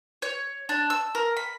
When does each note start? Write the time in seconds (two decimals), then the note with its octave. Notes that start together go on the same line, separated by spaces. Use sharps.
0.22 C#5
0.69 D4
0.90 E6
1.15 A#4
1.37 B5